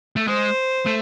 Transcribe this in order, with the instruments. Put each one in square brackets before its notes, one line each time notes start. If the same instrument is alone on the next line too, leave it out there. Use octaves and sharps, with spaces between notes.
[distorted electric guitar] A3
[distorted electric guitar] G#3 [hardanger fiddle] C5
[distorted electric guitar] A3